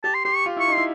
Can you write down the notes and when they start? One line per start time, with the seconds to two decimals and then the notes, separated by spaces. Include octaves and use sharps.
0.04 G4 A5
0.14 C6
0.25 G4 C6
0.36 C#6
0.46 F4
0.57 E4
0.60 C#6
0.68 D#4
0.74 E4 C6